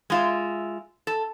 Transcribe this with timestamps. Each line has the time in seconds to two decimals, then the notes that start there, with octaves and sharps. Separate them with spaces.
0.10 G#3 F4 E5
1.07 A4